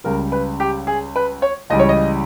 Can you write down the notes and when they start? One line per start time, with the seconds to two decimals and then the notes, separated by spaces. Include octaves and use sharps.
0.04 C#2 C#3 G3 A#4
0.32 B4
0.60 G4
0.87 G#4
1.16 B4
1.42 C#5
1.70 C#2 C#3 E3 G3 D#5
1.79 C#5
1.89 D#5